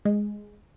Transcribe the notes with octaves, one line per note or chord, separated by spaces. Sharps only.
G#3